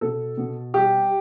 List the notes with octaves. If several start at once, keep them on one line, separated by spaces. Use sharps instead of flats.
B2 A4
B2
G3 G4